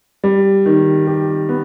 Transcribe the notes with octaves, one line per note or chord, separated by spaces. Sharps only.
G3
D#3
G4
B3